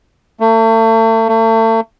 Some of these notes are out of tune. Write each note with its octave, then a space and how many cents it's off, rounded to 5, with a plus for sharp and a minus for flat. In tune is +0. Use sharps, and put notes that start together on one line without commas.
A3 +35
A3 +35